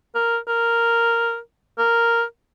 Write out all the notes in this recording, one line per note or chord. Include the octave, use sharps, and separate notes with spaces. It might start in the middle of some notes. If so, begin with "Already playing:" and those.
A#4
A#4
A#4